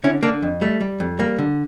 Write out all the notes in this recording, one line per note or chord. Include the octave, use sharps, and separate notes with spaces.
D3 C#4 E4
D3 A#3 D4
F2
G3 A3
G3
F2
G3 A#3
D3